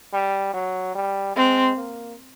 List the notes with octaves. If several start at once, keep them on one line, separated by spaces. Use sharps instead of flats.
G3
F#3
G3
G#3 C4
A#3